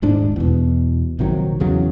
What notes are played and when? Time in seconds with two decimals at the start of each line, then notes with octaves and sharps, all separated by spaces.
0.02 D#1 G#2 D4
0.36 E2 B2
1.19 A#1 C3 D#3 F#3
1.60 E2 C#3 F#3